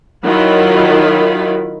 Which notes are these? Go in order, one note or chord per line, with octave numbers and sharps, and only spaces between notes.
D#3 F#3 E4 F4 B5